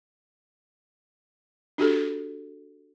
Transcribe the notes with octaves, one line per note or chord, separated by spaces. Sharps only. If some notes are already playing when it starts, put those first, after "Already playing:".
D4 F#4 G4 A4